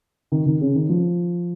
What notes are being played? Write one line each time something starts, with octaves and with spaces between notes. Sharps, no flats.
D#3
D#3
C#3
D#3
F3